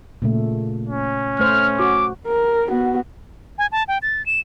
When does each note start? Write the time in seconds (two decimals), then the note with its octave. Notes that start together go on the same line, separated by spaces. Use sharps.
0.22 A#2 C#3 A3
0.87 C#4
1.39 A3 C5 F6
1.79 F#4 D6
2.28 A#4
2.69 B3 F#4
3.58 G#5
3.72 A5
3.88 G5
4.02 A6
4.26 E7